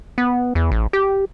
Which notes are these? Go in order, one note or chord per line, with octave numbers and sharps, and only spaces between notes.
B3
E2
A1
G4